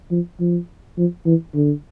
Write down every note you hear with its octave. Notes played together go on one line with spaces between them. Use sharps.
F3
F3
F3
E3
D3